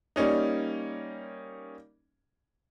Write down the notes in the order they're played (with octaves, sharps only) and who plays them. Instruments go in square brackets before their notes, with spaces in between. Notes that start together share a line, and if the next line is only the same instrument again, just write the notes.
[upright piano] G3 A#3 C#4 D#4